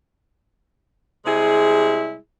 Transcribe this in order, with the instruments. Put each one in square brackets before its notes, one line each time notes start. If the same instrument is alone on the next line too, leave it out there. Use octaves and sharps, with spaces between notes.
[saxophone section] C3 G3 G#3 E4 G#4